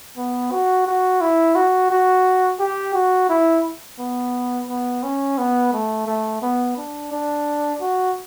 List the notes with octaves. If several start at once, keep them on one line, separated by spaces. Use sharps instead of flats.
B3
F#4
F#4
E4
F#4
F#4
G4
F#4
E4
B3
B3
C#4
B3
A3
A3
B3
D4
D4
F#4